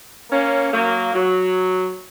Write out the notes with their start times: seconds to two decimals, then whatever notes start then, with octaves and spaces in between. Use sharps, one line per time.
0.31 A#3 C#4
0.73 F#3 A#3
1.14 F#3